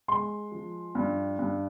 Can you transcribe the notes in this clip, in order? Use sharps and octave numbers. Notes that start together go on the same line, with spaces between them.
G#3 C6
F3
G2
G2